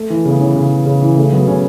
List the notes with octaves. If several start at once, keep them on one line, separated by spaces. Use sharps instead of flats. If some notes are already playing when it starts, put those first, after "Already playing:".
Already playing: A3
E3
C#3 B3
E3 C#4
C#3
E3
C#3
E3
C#3 A3
F#3 B3
C#3 C#4